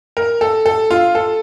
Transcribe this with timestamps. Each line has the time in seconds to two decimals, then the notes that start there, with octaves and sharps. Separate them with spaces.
0.17 A#4
0.41 A4
0.66 A4
0.91 F4
1.15 A4